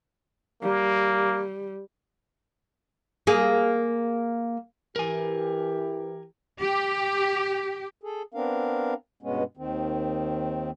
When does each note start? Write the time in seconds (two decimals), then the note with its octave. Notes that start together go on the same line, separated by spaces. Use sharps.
0.62 G3 A#3
3.27 A#3 G#4
4.96 E3 G4 A#4 G#5
6.59 G4
8.03 G#4 A4
8.34 B3 C4 D4 A#4 F5
9.23 G2 B2 G#3 B3 C#4
9.57 D#2 D#3 C4